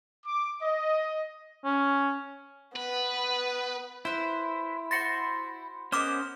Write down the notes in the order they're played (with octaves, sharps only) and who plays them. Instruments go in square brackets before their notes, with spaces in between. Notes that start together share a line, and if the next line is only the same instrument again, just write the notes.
[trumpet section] D6
D#5
[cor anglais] C#4
[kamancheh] B3 [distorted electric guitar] B4
[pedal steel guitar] E4 [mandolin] B4 C5
[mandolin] F#4 C5 C6 [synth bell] A6 A#6 C#7
[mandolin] B3 A#4 D#5 [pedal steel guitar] C#4 C5 [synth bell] D6 F6